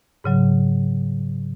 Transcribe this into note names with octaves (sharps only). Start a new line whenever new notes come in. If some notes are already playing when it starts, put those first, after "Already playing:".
G#2 C#3 F#3